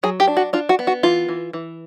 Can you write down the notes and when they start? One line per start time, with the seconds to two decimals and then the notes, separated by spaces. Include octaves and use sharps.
0.03 F#3 G#4
0.20 G4
0.27 D4
0.37 F#4
0.53 D4 F4
0.69 F#4
0.79 B3
0.87 F#4
1.03 E3 F4
1.29 E3
1.53 E3